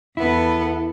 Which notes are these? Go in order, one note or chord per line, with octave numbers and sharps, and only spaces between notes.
E2 B3 E4 A4